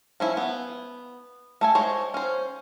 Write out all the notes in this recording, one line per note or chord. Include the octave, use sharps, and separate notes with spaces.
F3 C#4 E4
B3
A3 A4 G#5
G#3 C5 C#5
C#4 C5